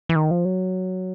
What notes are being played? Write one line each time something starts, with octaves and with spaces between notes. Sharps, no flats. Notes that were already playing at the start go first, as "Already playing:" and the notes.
E3
D#3
F3
F#3